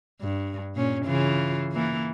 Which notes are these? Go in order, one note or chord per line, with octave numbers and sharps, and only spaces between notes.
G2
A#2 C#4
C#3 E3 F4
E3 A#3